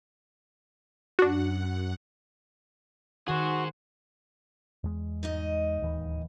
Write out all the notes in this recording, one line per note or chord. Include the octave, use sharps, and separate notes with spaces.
F#2 D4 F#4 F#5
D#3 F#4 G#4 C5 F#5
E2 G#3
G#2 D#4 D#5
D1 D#2 E3